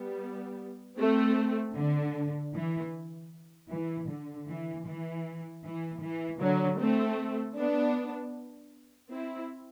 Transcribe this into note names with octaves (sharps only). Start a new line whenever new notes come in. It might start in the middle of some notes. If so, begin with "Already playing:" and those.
Already playing: G3 B3
A3 C4
D3
E3
E3
D3
E3
E3
E3
E3
D3 F#3
A3 C4
B3 D4
C4 E4